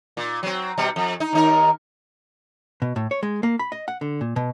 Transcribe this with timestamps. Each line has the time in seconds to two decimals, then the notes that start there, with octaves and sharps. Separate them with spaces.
0.17 A#2
0.43 F#3 C4
0.78 B2 G3 C4
0.96 F2
1.20 D#4
1.33 D#2 D#4 A#4
2.82 B2
2.96 A2
3.11 C#5
3.23 G#3
3.43 A#3
3.59 B5
3.72 D#5
3.88 F#5
4.01 D3
4.21 A#2
4.36 B2